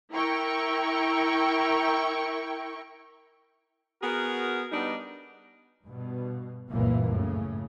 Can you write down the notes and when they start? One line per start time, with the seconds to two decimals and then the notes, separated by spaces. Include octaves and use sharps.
0.12 E4 A#4 G5 C#6
4.02 B3 F#4 G#4 A#4
4.72 G3 B3 D4 D#4
5.86 G2 B2
6.72 F#1 C#2 G2 A#2 E3 A#3
7.12 A2 C#3